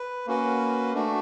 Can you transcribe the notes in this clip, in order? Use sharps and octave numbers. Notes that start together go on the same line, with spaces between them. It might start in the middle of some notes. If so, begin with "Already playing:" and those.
Already playing: B4
A#3 C#4 F#4 B4
A3 D4 F#4